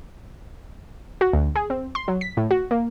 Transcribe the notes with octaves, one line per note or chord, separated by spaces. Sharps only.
F#4
D2
G#4
C4
C6
F#3
B6
A2
F#4
A#3